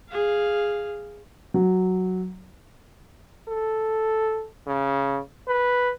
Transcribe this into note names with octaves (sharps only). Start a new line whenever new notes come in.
G#4 F5
F#3
A4
C#3
B4